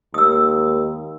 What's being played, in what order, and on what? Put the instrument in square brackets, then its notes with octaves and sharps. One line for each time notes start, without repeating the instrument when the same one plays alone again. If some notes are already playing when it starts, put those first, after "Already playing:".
[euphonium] D#2 [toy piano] D#6 E6